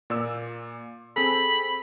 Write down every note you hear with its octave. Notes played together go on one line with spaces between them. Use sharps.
A#2 D5 E6
C4 G#4 A4 B5